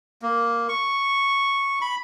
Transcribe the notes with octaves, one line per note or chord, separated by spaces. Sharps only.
A#3
C#6
B5